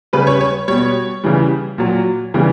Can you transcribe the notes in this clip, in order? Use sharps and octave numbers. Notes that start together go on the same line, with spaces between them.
C#3 G3 B4
C#5
C#5
B2 G3 C#5
C#3 E3 G3
A#2 F#3
C#3 E3 G3